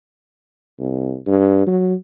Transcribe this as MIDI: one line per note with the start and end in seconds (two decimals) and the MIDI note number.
0.79 1.16 36
1.26 1.63 43
1.67 1.94 54